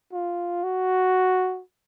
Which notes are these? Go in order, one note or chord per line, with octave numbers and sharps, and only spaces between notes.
F4
F#4